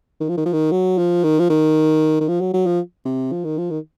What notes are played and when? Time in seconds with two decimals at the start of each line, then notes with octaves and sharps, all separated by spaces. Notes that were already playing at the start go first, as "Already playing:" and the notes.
0.21 D#3
0.29 F3
0.37 D#3
0.46 F3
0.53 D#3
0.72 F#3
0.98 F3
1.24 D#3
1.40 F3
1.50 D#3
2.21 D#3
2.28 F3
2.41 F#3
2.54 F#3
2.67 F3
3.06 C3
3.32 F3
3.44 D#3
3.58 F3
3.71 D#3